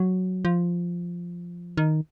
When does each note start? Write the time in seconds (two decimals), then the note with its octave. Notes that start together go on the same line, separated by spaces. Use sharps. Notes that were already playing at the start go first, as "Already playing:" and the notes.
Already playing: F#3
0.45 F3
1.77 D#3